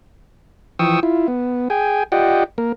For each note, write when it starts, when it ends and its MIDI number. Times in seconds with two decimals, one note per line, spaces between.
0.79 1.00 52
0.79 1.00 53
0.79 1.00 79
0.79 1.00 85
0.79 1.00 87
0.79 1.00 88
1.03 1.27 64
1.03 1.27 65
1.28 1.68 59
1.70 2.03 68
1.70 2.03 79
1.70 2.03 80
2.12 2.44 65
2.12 2.44 67
2.12 2.44 74
2.12 2.44 75
2.12 2.44 78
2.12 2.44 79
2.58 2.72 58
2.58 2.72 70